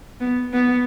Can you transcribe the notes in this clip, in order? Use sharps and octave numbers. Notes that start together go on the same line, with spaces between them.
B3
B3